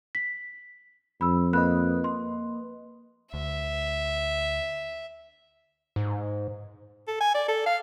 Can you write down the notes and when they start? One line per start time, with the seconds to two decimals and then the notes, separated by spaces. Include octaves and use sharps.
0.15 B6
1.21 F2 B5 E6
1.53 A#3 B4 D#5 B5 F#6
2.04 C6
3.34 D2 E5
5.96 G#2
7.08 A4
7.21 G#5
7.35 D5
7.48 A4
7.66 F5